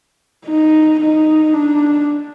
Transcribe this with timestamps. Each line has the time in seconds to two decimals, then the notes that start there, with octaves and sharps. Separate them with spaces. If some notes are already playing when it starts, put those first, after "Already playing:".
0.46 D#4
1.01 D#4
1.54 D4